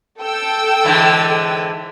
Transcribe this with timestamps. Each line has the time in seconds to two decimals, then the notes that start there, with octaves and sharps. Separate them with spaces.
0.20 A4 G5 E6
0.85 G#2 D3 E3